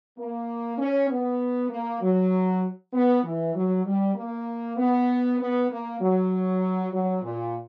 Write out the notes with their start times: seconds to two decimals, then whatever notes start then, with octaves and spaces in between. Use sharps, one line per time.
0.17 A#3
0.78 C#4
1.09 B3
1.69 A#3
2.01 F#3
2.92 B3
3.23 E3
3.54 F#3
3.85 G3
4.15 A#3
4.77 B3
5.39 B3
5.69 A#3
6.00 F#3
6.92 F#3
7.22 A#2